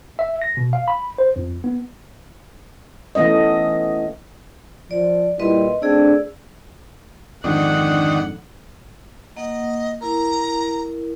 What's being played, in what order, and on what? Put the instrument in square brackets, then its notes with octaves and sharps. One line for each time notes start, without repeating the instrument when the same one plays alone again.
[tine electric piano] E5
A#6
B2
F5
B5
C5
F2
B3
[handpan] E3 A3 B3 C#4 D#5
[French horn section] F3 [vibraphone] D5
[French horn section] A#2 G3 E4 [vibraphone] B4 D#5 C6
[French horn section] A3 C4 D4 [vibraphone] G#4 D5 E6
[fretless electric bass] F2 G#2 D3 [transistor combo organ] D#3 D4 [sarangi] F#5
[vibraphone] A#3 F#5 [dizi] D#5
[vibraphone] E4 A#4 [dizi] A#5